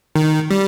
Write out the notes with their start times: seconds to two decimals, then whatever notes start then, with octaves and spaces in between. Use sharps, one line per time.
0.16 D#3
0.51 G3